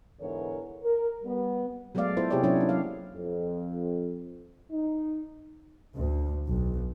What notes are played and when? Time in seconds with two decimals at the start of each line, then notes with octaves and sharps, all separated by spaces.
0.20 G#2 D3 E3 B3 A#4 C#5
0.83 A#4
1.24 G3 B3
1.95 F#3 G#3 A3 B3 D5 F5
2.17 B3 E4 F4 A4 C5
2.30 C3 A#3 G4 G#4 C#5 D5
2.44 F#3 C#4 D4 E4 F#4 C#5
2.56 A#3 D#4
2.69 F#3 D5 F5
3.14 F2
4.71 D#4
5.95 D2
6.46 B1